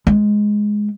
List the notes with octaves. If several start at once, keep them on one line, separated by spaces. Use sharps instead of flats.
G#3